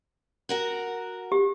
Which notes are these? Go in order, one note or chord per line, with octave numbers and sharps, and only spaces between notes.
F#4 A#4 F#5
G4